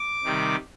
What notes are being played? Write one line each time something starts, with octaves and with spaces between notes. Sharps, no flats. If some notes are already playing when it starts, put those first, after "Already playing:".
Already playing: D6
C3 D#3 G3